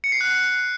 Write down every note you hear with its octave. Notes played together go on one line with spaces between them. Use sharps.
C#7
C7
F#6